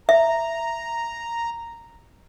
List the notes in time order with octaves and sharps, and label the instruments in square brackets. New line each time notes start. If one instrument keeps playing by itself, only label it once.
[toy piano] E5 [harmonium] A#5